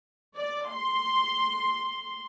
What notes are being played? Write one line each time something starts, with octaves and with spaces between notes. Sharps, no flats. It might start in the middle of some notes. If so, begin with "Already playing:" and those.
D5
C6